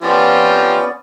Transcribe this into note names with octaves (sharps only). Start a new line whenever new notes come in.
F3 B3 C#4 F4 G4 D5